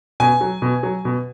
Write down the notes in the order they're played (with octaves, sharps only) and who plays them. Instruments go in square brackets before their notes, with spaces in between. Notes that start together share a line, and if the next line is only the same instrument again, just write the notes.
[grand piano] B2 G#5
F#3
B2
F#3
B2